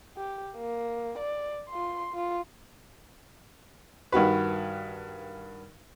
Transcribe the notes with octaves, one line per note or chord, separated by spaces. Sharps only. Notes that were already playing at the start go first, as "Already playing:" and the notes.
G4
A#3
D5
F4 C6
F4
G2 D#3 F#4 B4